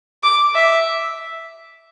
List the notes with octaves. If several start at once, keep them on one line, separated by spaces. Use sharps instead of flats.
D6
E5